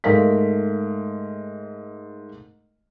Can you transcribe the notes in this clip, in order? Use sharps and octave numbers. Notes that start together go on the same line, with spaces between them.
G#2 A3 A#4 F5 B6